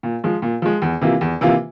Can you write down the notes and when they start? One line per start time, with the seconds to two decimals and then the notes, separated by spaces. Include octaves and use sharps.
0.03 A#2
0.24 F3 G#3
0.42 A#2
0.62 F3 G#3
0.82 E2
1.02 C3 E3 A#3 F4
1.21 E2
1.41 C3 E3 A#3 F4